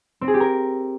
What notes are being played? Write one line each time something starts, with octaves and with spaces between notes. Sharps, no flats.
C4
G#4
G4
A#4